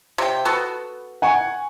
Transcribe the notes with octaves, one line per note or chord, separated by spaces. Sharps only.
C3 G5
B3 F#4 A4
F#5 G#5 C#6